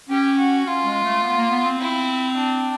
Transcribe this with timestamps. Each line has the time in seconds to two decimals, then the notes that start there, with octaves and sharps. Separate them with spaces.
0.09 C#4 G4
0.38 F#4
0.66 C#4 F4
0.85 G#3
1.04 A3
1.23 B3
1.37 A#3
1.51 B3
1.65 C4
1.80 E4
2.37 D4